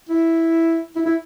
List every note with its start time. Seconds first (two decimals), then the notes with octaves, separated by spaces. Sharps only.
0.09 E4
0.96 E4
1.06 E4